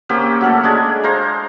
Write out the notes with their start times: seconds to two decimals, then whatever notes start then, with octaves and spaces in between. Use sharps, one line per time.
0.09 A#3 C4 C#4 G4
0.41 F#3 A3 C#4 A4
0.63 G#3 D4 G#5
1.03 C5 F5 A#5